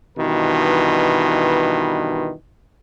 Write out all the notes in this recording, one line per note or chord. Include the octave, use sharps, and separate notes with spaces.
G2 B2 D#3 E3 B4